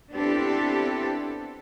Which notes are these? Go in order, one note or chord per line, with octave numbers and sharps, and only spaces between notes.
B3 C4 D4 E4 G4 A4